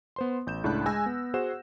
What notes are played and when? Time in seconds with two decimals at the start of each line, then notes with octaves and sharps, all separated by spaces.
0.16 B3 C5 C6
0.47 A1 G6 E7
0.64 C#2 A2 D4 A5 B5 F#6
0.86 G#3 G#5 E6 A#6
1.06 B3
1.34 F#4 G#4 C5 F#5 E7